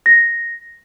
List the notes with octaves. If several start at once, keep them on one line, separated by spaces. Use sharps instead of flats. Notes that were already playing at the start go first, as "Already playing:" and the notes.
A#6